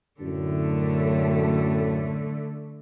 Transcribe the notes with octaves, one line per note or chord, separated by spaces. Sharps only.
F#2 A2 D3 A3